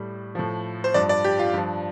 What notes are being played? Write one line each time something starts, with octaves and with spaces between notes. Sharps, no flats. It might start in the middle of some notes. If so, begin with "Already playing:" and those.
Already playing: A2 G3
A2 F3
C5
G2 F3 D5
D5
G4
F4
G2 F3